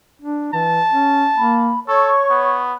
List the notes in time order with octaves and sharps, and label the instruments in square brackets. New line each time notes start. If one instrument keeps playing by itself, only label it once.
[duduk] D4
[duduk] E3 [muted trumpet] A5
[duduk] C#4
[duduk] A#3 [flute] B5
[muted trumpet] A4 [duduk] C#5 [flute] C#6
[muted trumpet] B3